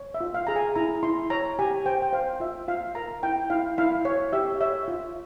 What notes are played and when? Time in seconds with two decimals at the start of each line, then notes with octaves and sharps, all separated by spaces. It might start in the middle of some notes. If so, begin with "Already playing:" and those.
Already playing: C#5
0.14 E5
0.21 F4
0.34 F5
0.47 G#4 A#5
0.56 G#5
0.75 E4 A#5
1.03 E4 C6
1.30 C#5 A#5
1.59 G4 G#5
1.86 C5 G5
2.02 G5
2.13 C5 F5
2.40 F4 E5
2.68 F4 F5
2.95 A#4 A#5
3.23 E4 G5
3.50 E4 F5
3.78 E4 F5
4.05 C#5
4.33 G4 E5
4.61 C#5 E5
4.88 F4